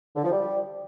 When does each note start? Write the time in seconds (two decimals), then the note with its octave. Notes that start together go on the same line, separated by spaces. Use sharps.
0.16 D3
0.24 F3
0.32 G3